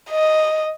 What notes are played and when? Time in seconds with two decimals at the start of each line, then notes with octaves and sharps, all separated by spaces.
0.10 D#5